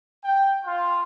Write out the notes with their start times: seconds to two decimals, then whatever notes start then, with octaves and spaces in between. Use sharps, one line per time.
0.24 G5
0.64 F4